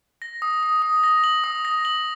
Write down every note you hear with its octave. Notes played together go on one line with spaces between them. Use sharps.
A#6
D#6
D#6
D#6
A#6
F#7
D#6
A#6
F#7